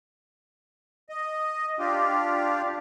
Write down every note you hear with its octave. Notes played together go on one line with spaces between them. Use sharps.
D#5
D4 F4 G4